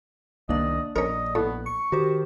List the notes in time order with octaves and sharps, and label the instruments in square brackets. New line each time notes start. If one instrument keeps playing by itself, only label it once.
[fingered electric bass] C2 D#3 [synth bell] A#3 D4 D5 [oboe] D#5
[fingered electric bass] A#1 [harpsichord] C#4 A#4 [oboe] D#5
[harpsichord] A2 [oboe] B3
[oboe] C#6 [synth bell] C#7
[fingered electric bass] D#3 [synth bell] F#4 G4 C5